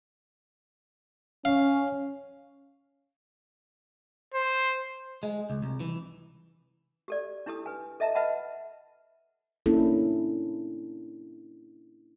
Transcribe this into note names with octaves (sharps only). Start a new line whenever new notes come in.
C#4 F5
C5
G#3
C#2
C2
E3
G4 A4 D5
D4 E4 G4 A4 D#6
B4 G#5
A4 D#5 E5 A5 A#5
B4 D#5 E5 F#5 A5 B5
A#3 C#4 D4 E4 A4